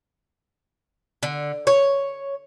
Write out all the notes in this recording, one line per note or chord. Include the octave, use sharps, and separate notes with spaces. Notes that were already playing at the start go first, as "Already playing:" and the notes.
D3
C#5